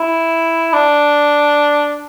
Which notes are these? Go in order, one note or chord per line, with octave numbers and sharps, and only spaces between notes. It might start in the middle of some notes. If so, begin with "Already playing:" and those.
Already playing: E4
D4